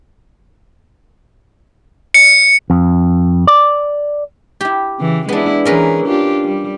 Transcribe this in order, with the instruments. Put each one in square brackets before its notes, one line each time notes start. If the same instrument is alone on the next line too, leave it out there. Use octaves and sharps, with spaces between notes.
[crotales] C#7
[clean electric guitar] F2
D5
[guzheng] E4 G4
[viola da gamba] C#3 E3
[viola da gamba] G#3 E4 [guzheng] B3 D4
[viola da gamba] E3 G#4 [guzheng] C#4 A#4 B4
[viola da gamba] D4 F4 G4
G3